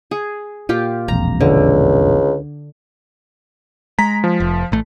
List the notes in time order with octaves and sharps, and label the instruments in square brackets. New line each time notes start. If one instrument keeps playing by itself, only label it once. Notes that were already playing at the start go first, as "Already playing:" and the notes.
[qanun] G#4
[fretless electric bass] A#2 [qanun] F4 G4
[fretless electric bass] E1 A#1 F2 [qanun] A#5
[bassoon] C#2 [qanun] D3
[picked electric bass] G#3 [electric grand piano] A#5 B6
[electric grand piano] F3
[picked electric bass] F1
A1 A3